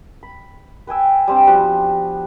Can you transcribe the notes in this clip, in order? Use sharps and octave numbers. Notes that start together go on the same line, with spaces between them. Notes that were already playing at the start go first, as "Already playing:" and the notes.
B5
B4 G5 G#5 E6
G3 C4 D4
F3 B3 F#4 G4